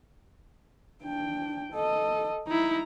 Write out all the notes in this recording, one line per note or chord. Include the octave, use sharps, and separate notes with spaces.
D4 G5
A4 D#5
D#4 E4 A#5